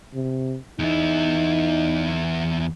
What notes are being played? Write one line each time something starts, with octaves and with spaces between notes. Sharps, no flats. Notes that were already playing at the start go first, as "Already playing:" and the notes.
C3
E2 D#4 E4